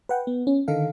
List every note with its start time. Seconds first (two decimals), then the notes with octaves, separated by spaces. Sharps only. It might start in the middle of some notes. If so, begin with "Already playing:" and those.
0.09 B4 F#5 G5
0.27 B3
0.47 C#4
0.68 D3 D#3 D#4 A4 F5